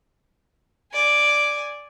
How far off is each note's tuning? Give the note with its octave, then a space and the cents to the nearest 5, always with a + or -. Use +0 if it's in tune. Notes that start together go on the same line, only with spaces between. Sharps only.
D5 +0 G#5 +0